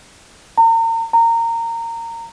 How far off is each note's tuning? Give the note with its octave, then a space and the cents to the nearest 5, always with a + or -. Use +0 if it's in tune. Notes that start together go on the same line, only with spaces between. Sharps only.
A#5 -40
A#5 -20